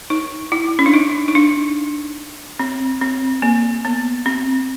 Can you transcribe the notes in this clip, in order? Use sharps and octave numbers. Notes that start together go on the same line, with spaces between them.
D#4
E4
C#4
D4
D#4
D#4
D4
C4
C4
A#3
B3
C4